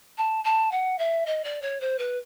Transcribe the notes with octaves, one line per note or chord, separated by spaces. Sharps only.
A5
A5
F#5
E5
D#5
D5
C#5
C5
B4